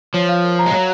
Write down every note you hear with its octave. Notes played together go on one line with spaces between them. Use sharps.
F3 C#5
F5
A#4
A#5
G#3
F#3 C#5